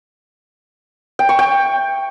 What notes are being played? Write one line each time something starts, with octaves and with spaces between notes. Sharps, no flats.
G5
C#6
G5